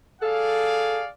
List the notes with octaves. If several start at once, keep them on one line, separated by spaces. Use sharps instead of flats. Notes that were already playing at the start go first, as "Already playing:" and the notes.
G#4 A4 D5 F5